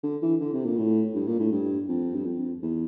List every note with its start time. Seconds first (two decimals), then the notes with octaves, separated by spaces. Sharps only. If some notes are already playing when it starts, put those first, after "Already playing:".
0.03 D3
0.22 E3
0.40 D3
0.53 C3
0.65 A#2
0.77 A2
1.15 G2
1.27 A#2
1.39 A2
1.52 G2
1.88 F2
2.15 G2
2.26 F2
2.62 E2